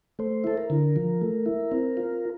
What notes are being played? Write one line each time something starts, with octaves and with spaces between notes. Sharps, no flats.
A3 C5
E4 A4
A#4
D3
F3
A3
E4
C4
F4